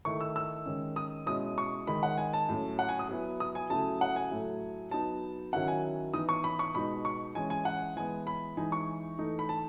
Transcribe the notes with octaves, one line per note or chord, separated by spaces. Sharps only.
D#3 A3 E4 C#6
E6
E6
D#3 G#3 C#4
D#6
B2 G#3 C#4 E4 D#6
C#6
D#3 G#3 D#4 B5
F#5
G#5
A5
A2 F#3 C#4
F#5
G#5
D#6
F#3 B3 E4
D#6
G#5
C#3 F#3 A3 E4 A5
F#5
G#5
A2 F#3 A3 E4
F#3 B3 D#4 A5
D#3 F#3 C#4 E4 F#5
G#5
E3 B3 D#4 D#6
C#6
B5
C#6
B2 G#3 B3 D#4 B5
C#6
E3 G#3 C#4 G#5
G#5
F#5
E3 G#3 B3 G#5
B5
E3 G#3 D#4 G#5
C#6
E3 A3 D#4
B5
A5